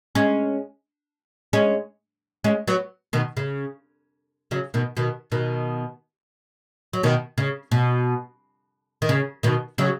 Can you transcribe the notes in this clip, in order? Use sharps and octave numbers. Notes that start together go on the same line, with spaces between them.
G#3 C#4
G#3 C#4
G#3 C#4
F#3 B3
B2 D#3
C#3
C#3 F#3
B2 D#3
B2 D#3
B2 D#3
F#3
B2 D#3
C#3
B2
D#3
C#3
B2 D#3
C#3 F#3